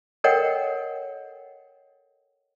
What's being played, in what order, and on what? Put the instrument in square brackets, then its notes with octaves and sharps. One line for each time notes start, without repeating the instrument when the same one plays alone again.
[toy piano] A4 A#4 C#5 D#5 F#5 G5